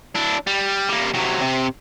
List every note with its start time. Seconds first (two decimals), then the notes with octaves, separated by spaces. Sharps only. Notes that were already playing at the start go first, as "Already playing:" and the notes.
0.15 D4 E4
0.47 G3
0.89 G3 A#3
1.14 C3 F#3
1.41 C3